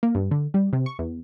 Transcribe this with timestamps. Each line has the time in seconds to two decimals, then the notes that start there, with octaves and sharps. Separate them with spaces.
0.03 A#3
0.15 G2
0.31 D3
0.54 G3
0.73 C3
0.86 C#6
0.99 E2